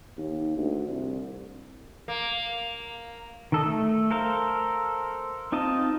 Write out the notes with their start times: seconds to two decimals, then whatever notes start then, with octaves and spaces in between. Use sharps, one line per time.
0.18 D#2
0.57 D2
0.88 C2
2.08 A#3
3.52 D#3 A4 D#5
3.65 A3 E6
4.11 A4 A#4 C5 F5
5.52 C4 D#4 F4 D#5 A5